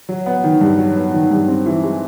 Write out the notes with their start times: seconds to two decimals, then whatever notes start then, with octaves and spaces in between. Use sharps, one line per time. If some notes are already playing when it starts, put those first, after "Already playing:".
0.09 F#3
0.26 B3
0.44 D#3
0.61 G2
0.79 F#3
0.96 B3
1.14 D#3
1.31 G2
1.48 C4
1.66 E3
1.84 G#3